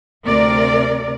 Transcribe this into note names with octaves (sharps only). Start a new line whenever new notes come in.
D2 C3 A#4 D5